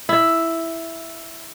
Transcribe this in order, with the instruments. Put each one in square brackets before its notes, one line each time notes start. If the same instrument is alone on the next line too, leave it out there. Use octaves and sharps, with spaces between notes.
[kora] E4